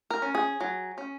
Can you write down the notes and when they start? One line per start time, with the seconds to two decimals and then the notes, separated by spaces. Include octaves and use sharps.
0.10 A#4
0.22 C#4
0.35 G#4
0.61 F#3
0.98 C#4